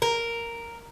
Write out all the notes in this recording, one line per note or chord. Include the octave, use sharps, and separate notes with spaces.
A#4